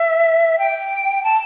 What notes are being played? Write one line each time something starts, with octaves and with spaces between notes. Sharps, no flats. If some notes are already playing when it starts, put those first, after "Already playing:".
Already playing: E5
G5
A5